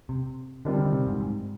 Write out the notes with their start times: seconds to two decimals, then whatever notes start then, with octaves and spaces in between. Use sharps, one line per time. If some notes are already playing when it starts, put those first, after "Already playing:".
0.09 C3
0.65 D3 D#3 G3 C4 F4
0.79 D3
0.93 C3
1.07 G#2
1.20 G#2